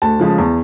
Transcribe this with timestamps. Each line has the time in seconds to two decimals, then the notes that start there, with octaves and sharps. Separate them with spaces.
0.02 D2 A5
0.19 C#3 F3 G#3
0.38 E2